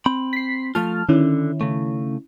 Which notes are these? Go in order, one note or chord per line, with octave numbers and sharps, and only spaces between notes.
C4 B5
B6 C7
F3 A3 F4 A5 F6
D3 D#3 C#4 E4
C#3 A3